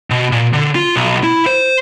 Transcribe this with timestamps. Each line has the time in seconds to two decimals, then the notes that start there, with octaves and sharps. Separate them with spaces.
0.10 B2
0.32 A#2
0.53 D3
0.75 F4
0.96 B1
1.23 E4
1.46 C5